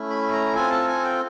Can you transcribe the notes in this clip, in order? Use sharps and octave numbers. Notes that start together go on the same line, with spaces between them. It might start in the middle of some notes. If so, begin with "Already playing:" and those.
Already playing: A3 C#4 E4
B5
A#5
C4 F4 A4 G#5
A5
G#5
G5